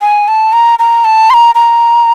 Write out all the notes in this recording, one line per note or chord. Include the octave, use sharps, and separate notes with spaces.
G#5
A5
A#5
A#5
A5
C6
A#5
A#5